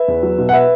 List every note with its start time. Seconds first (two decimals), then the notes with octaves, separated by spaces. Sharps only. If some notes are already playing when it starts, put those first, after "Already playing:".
Already playing: B4 E5
0.08 E2
0.23 F#3
0.38 B2
0.49 F#5
0.53 B4 E5